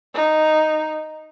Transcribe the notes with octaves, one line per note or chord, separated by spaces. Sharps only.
D#4